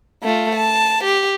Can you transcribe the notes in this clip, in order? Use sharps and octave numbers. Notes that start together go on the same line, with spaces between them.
A3 F4
A5
G4